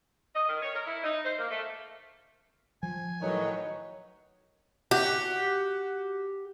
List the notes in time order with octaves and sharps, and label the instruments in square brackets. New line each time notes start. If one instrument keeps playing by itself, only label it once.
[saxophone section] D#5
D#3
C#5
A#4
E4
D#4
C5
A#3
A3
[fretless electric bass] F3 [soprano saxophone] G#5
[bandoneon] A2 D#3 D#4 [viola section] F#3 B4 C#5
[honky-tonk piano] F#4 [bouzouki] G4